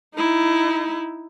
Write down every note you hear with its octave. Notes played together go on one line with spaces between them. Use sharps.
D#4 E4